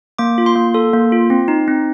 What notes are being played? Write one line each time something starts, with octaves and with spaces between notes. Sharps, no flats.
A#3 D6
F4
C6
A#3
A4
A#3
F4
C4
D#4
C4